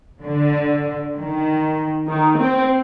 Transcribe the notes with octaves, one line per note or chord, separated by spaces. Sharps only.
D3
D#3
D#3
C4